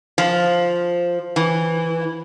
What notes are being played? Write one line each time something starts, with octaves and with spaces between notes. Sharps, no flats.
F3
E3